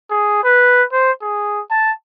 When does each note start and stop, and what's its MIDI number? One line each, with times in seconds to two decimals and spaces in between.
0.10 0.39 68
0.44 0.83 71
0.93 1.11 72
1.22 1.60 68
1.70 1.91 81